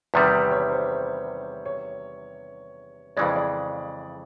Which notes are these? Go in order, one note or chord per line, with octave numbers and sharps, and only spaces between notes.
E2 C3 D#3 G3 B4
C#5
C5
C#5
F2 C#3 E3 G#3 D5
D5